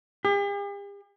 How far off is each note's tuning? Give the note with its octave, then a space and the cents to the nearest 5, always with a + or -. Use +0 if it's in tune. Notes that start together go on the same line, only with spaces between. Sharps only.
G4 +45